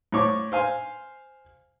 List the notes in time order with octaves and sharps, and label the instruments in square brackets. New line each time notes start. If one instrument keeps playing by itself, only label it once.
[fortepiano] A2 C5 C#5 C#6 D6
C5 F5 G#5 C6